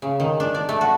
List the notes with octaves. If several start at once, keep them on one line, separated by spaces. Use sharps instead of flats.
C#3
D#3
D4
D5
A3
F#4